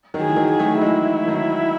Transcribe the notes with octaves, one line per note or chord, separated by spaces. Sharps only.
D#3 F#3
G#4
E3
D#3 F#3
G#4
F#3 A3
E3 G#3 E4
D#3 F#3